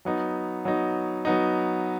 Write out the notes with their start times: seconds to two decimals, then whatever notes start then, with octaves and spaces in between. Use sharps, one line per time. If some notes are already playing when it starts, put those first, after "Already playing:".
0.05 F#3 B3 D#4
0.65 F#3 B3 D#4
1.25 F#3 B3 D#4